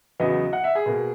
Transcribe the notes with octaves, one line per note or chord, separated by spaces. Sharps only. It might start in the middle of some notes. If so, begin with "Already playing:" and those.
E2 C#3 F#3 B3 D#5
F#5
E5
G#4
B2 A#3